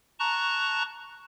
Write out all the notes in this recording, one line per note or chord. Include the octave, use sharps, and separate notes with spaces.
A5 A#5 C#6 F#6